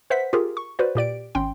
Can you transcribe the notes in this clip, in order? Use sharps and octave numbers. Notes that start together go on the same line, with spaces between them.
B4 C5 E5 F#5 B6
F4 G4 G#4 A#4
C#6
F#4 B4 C5 D5
A#2 G4 D5 D7
G#1 C#4 G5 C6